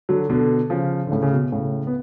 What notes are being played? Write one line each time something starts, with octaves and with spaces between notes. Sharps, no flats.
D3 F#3
B2 D3
C#3 F3
D3
A2 C#3
C#3
B2
A2 C#3
B3